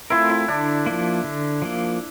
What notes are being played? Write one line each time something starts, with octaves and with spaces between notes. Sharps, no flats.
A3 C4 E4 F4 A#4
E4
D3 D4
F3 A#3
D3
F3 A#3